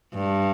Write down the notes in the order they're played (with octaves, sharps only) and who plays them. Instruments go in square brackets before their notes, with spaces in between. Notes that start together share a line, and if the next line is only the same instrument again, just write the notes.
[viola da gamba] G2